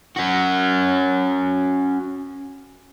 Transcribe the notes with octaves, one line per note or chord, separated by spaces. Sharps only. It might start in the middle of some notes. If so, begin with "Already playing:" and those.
C#4 F#4